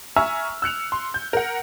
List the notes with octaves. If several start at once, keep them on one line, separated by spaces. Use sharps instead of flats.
E5 G#5 A#5 C#6 E6 F6
E6 F#6 C#7 F7
C6
G6
A#4 F#5